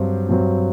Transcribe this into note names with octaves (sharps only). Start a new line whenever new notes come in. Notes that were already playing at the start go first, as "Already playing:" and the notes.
Already playing: G2 F#3 C4
G2 F#3 C4